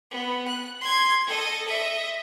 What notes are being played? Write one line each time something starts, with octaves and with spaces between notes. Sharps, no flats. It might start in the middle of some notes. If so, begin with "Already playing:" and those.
B3
F#6
C6 G#6
A4 D#5
D#5 E5